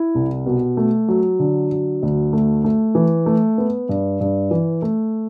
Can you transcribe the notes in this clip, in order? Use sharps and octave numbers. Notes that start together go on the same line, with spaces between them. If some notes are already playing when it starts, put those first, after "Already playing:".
Already playing: E4
C2
B2
A3
F#3
D3
F#3
D2
A3
A3
E3
A3
B3
G2
G2
E3
A3